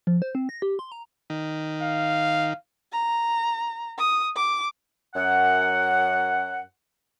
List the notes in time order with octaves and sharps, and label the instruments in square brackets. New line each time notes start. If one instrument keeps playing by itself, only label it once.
[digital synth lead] F3
C5
C4
A#6
G4
C6
A#5
[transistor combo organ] D#3
[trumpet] F5
[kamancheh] A#5
D#6
D6
[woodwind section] F#2 F#5